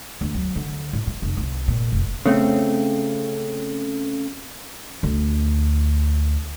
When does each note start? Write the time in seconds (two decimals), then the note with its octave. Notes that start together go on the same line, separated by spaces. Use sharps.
0.21 D2
0.34 F#3
0.56 D3
0.93 A2
1.07 G3
1.22 F1
1.37 C2
1.68 A#2
1.92 F1
2.26 C#3 A3 C4
5.03 D2